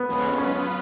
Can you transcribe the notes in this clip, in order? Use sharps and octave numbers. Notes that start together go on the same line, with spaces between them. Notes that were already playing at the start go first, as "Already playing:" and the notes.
Already playing: B3
F2 F3 G#3 C#4
F#3 B3 C#4 F4 B4